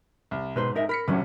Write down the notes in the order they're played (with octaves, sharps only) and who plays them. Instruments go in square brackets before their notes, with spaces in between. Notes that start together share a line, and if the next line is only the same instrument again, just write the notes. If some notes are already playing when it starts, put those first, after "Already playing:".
[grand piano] C2
[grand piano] G#2 [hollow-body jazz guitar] B2 B4 C5
[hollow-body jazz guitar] D#4 A#4 E5
[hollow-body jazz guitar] A#4 [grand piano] B5 B6 C#7
[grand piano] G1 C2 [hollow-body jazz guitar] D3 F#3 C#4